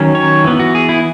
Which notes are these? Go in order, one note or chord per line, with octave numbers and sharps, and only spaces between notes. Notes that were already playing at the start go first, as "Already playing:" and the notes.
Already playing: D#3 F#3 C#4
C#5
E3 B3
F#4
G#4
E4